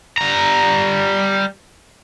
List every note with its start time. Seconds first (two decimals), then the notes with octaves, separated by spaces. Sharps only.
0.18 G3 A#5